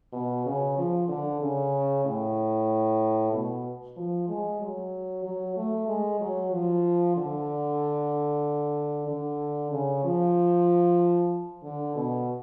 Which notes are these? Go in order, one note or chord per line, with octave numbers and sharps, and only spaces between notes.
B2
C#3
F3
D3
C#3
A2
B2
F3
G#3
F#3
F#3
A3
G#3
F#3
F3
D3
D3
C#3
F3
D3
B2